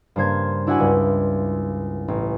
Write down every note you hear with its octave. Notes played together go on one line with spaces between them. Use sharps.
G2 C#3 A#3 C5 G#6 A6
D4 E4 F#4 F#5 G#5 D6
C#2 G2
A1